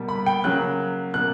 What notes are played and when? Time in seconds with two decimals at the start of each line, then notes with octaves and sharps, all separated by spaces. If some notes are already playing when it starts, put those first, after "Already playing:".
Already playing: B2 G3 A#3
0.08 B5
0.26 G5
0.44 C#3 F#3 A#3 F#6
1.14 B2 A#3 F#6